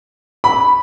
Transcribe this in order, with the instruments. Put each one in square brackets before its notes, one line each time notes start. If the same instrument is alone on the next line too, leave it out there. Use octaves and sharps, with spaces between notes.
[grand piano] B5